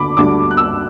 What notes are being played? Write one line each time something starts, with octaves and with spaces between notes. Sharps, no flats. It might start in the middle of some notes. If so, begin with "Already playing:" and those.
Already playing: D2 D3 B5 D6
D2 D3 G3 D4 D6
F#6
E6